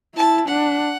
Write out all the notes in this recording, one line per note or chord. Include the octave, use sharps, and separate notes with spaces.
E4 A5
D4 F#5